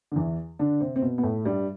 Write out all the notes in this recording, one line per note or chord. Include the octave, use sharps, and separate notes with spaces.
D3
E2 E3
D3 D4
C3 C4
C4
B2 B3
B3
A2 A3
G2 G3